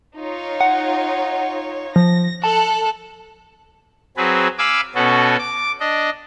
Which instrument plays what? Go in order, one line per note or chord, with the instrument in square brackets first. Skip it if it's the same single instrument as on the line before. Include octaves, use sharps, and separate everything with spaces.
[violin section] D#4 F4 C#5
[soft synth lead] F#5
[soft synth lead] F3 [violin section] A#6
[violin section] A4 F#6 [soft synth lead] A5
[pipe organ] F#3 C4 G#4 B4
F5 G#5 B5 D6 E6
B2 B3 C#4 F#4 A4
D6
D4 D#5